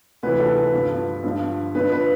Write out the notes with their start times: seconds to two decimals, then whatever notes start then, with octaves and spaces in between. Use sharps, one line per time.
0.23 D2 C3 E3 B4
0.40 A4
0.57 B4
0.73 G2 D3 F3
1.24 G2 D3 F3
1.75 F2 D3 F3 B4
1.92 B4